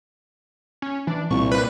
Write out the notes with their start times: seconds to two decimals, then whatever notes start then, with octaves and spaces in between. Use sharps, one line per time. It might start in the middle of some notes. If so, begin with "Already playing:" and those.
0.82 C#4
1.07 E3 D4
1.30 C2 A#2 C#6
1.52 G3 B4